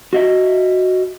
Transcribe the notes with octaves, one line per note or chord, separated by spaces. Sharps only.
F#4 D#5 E5